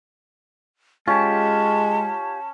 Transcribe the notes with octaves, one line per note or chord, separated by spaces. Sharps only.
G#3 C#4 F4 G4 A5